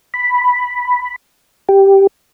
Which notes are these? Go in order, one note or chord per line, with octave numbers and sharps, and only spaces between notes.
B5
G4